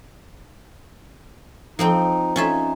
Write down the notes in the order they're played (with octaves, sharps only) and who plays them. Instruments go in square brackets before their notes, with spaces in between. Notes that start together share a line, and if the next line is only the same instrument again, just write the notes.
[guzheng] F3 C4 G5 [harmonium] D#4
[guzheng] C#4 F4 E5 [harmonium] D#4